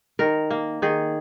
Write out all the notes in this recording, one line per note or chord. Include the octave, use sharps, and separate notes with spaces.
D#3 A#4
A#3
D#3 G#4